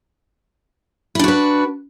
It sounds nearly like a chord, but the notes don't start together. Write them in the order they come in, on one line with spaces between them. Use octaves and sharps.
E4 D4 F#4 B4